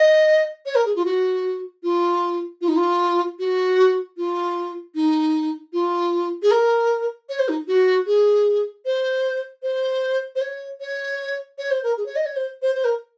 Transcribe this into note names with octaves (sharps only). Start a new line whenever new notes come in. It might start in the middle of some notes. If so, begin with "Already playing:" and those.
Already playing: D#5
C#5
A#4
G#4
F4
F#4
F4
F4
D#4
F4
F#4
F4
D#4
F4
G#4
A#4
C#5
C5
D#4
F#4
G#4
C5
C5
C5
C#5
C#5
C#5
C5
A#4
G#4
C#5
D#5
C#5
C5
C5
C5
A#4